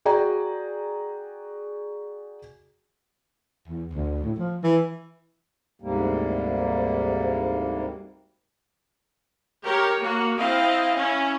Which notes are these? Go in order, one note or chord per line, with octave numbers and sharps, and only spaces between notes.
F#4 G#4 D5 G5 A#5
E2
D2
A2
F3
E3
D2 G#2 C3 G3 A#3
G4 A#4 C#5
A#3 F#4
C4 E4 D#5 F5
C#4 E4